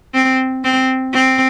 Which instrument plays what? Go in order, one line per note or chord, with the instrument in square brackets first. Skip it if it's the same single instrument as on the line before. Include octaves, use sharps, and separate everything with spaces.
[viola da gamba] C4
C4
C4